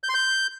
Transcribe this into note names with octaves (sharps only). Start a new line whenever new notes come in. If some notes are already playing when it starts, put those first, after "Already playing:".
G6
C6
G6